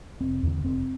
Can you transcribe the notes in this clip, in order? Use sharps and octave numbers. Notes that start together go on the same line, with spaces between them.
F1 C4
E2 D3
F1 C4